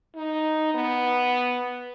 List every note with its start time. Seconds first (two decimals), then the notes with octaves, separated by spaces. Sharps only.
0.16 D#4
0.74 B3